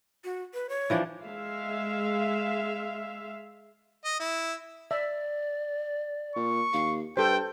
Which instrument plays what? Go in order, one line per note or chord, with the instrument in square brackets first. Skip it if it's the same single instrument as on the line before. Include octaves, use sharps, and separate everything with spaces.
[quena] F#4
B4
C#5
[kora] E3 F3 D4
[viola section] G#3 E5 F5
[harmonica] D#5
E4
[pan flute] D5 [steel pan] E5
[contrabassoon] A#2 [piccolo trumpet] C#6
[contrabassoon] D#2 [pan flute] F5
[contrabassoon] G2 [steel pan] A4 C5 [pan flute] B4 [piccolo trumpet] G5